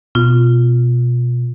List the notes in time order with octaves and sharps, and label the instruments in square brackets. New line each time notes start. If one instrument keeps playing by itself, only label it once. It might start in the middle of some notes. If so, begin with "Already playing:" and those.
[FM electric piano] B2 [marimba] F4